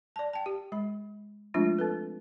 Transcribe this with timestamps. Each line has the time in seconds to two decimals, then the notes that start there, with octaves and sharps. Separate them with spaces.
0.16 D5 A5
0.33 G5 A5
0.46 G4
0.72 G#3 B5
1.54 F3 G#3 A3 C4 D4 F4
1.79 C4 A4 B4